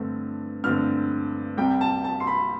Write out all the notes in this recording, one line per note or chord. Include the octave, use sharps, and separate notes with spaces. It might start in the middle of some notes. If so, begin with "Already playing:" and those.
Already playing: G2 D3 A3 C4
G2 D3 A3 C4 F6
C2 C3 G3 G5
A5
A5
C6
B5